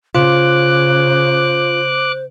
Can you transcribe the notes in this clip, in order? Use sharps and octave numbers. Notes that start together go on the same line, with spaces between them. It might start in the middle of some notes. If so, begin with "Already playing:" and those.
C#3 F4 C5 D6 F#6